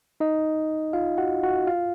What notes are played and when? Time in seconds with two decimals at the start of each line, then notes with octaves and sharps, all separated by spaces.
0.20 D#4 D#5
0.93 F4 F5
1.18 F#4 F#5
1.43 F#4 F#5
1.67 F4 F5